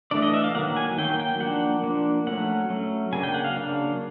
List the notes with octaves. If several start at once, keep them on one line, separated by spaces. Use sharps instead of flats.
E3 A3 D4 D5
D#5
E5
F5
D#3 F#3 A#3 F#5
G#5
D#3 F#3 A#3 G5
G5
F3 A#3 D4 F#5
F3 A#3 D4
F#3 A3 C#4 F#5
F#3 A3 C#4
C#3 F#3 A#3 D4 G#5
G5
F#5
F5
C#3 F#3 A#3 D4